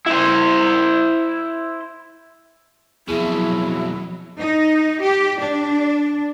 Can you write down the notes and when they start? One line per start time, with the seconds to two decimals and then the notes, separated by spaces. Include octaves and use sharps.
0.07 E4 C5
3.08 F2 B2 F#3 E4 G#4
4.39 D#4
5.00 G4
5.39 D4